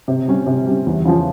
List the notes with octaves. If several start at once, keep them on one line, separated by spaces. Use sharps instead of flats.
C3
G3 C#4
C3
G3 C#4
E2
C#3 F3